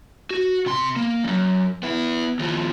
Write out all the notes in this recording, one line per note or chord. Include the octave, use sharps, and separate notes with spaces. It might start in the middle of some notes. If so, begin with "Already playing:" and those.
F#4
C3 C6
A#3
F#2 F3
B3 E4
D#2 F3